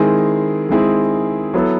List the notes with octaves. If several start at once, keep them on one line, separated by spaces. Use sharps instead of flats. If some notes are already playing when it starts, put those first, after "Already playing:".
Already playing: D#3 G#3 C4 E4 G#4
D#3 G#3 C4 E4 G#4
F#3 B3 E4 A4